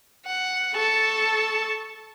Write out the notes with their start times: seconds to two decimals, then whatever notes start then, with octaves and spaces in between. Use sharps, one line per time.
0.25 F#5
0.73 A4 A5 C#6